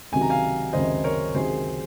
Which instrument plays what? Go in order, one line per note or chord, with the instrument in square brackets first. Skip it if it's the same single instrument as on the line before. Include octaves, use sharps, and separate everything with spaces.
[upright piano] C#2 C3 D#3 F#3 [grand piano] G#5
[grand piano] A#5
F5 G#5
[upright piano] C#2 C3 D#3 F#3 [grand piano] C5 D#5
[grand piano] A#4 C#5
[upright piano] C#2 C3 D#3 F#3 [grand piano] G#4 C5